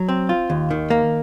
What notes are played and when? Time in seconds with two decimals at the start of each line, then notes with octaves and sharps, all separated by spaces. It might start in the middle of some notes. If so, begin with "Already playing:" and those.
Already playing: F#3
0.09 C4
0.29 F4
0.50 D#2
0.71 D#3
0.90 A#3